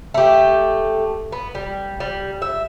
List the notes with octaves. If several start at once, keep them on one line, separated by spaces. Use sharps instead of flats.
A3 G4
B3
G3
G3
E5